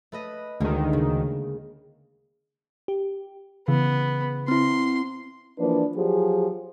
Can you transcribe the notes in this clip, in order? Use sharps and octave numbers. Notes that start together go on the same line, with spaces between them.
A3 B4 D#5
D2 D3 D#3 G#3 A#3
C#3
G4
C#3 E3 B3
C4 E4 C6
E3 F3 A#3 D4 B4 D5
F3 F#3 G4 G#4